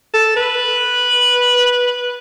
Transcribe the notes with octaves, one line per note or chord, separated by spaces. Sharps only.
A4
B4